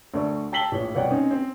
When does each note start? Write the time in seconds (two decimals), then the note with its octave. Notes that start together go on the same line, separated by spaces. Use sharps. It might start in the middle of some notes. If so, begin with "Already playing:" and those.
0.14 D2 A3 A4 D5 C#6
0.52 G5 A5 E6 B6 F#7 G7
0.71 A#1 A2 C#5
0.95 C2 B2 C#5 D5 F#5 G5
1.11 C4 C#4 D#4 C5
1.31 C4